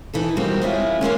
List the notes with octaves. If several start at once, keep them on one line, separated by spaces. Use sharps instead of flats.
E3 D#4 A4
G3 G#3 A#3 C4 F#4
G#3 C#4 E4 F4
E3 G#3 A#3 C#4